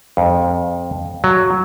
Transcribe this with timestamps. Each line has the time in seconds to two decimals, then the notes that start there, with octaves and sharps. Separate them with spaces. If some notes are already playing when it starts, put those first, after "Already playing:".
0.17 F2
1.24 F#3